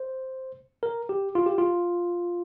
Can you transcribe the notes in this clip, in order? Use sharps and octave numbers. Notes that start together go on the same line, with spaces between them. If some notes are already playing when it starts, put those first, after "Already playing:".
Already playing: C5
A#4
G4
F4
G4
F4